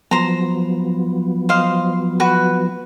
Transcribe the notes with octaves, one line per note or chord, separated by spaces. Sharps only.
F3 F#3 B3 C5 A#5
C5 D#5 F5
F#4 B4